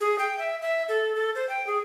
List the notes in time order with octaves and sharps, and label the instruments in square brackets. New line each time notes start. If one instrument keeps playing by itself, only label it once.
[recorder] G#4
G5
E5
E5
A4
A4
C5
G5
G#4